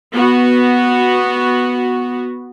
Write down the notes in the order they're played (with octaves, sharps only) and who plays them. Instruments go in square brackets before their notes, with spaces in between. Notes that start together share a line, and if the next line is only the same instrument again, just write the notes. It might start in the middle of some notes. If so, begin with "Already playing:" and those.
[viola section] B3 F#4